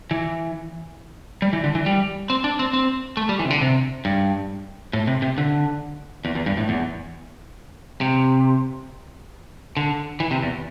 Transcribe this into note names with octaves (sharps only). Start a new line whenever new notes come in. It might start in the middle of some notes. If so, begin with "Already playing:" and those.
E3
G3
E3
D3
E3
G3
C4
D4
C4
C4
A3
G3
E3
C3
D3
C3
G2
A2
C3
C3
D3
E2
E2
G2
A2
E2
C3
D3
E3
C3
E2